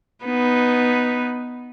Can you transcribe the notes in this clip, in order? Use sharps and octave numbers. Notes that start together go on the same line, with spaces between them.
B3 D#4 B4